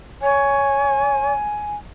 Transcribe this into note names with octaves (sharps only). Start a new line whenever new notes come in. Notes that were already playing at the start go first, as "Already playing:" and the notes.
C#5 G#5